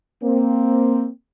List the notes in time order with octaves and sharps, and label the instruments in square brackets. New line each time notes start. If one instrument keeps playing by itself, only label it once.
[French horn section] A#3 C4